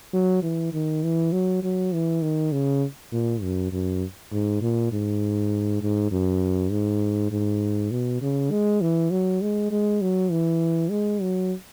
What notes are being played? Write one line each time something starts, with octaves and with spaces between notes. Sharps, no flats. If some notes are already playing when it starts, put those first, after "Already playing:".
F#3
E3
D#3
E3
F#3
F#3
E3
D#3
C#3
A#2
F#2
F#2
G#2
A#2
G#2
G#2
F#2
G#2
G#2
B2
C#3
G#3
E3
F#3
G#3
G#3
F#3
E3
G#3
F#3